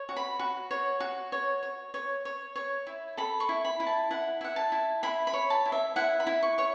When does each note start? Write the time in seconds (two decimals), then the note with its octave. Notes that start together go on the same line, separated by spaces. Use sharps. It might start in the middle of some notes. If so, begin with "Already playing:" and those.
Already playing: C#5
0.09 F#4
0.17 B5
0.39 F#4
0.71 C#5
1.00 F#4
1.32 C#5
1.63 C#5
1.94 C#5
2.25 C#5
2.56 C#5
2.87 E4
3.17 A4 B5
3.40 C#6
3.49 E4
3.65 B5
3.80 E4
3.87 A5
4.11 E4 F#5
4.41 E4 F#5
4.56 A5
4.72 E4
5.03 E4 B5
5.27 B5
5.34 C#5
5.50 A5
5.66 E4
5.72 E5
5.96 E4 F#5
6.20 B5
6.27 E4
6.43 C#6
6.58 C#5 C#6